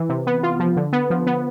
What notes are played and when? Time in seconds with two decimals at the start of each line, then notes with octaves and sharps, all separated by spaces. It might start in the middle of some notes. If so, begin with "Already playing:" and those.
Already playing: E3
0.09 C3
0.27 B3
0.43 F4
0.60 F3
0.76 D3
0.93 B3
1.10 F3
1.27 B3